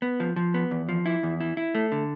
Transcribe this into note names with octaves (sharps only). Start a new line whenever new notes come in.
B3
F3
F3
B3
E2
F3
E4
E2
E4
E4
A3
D3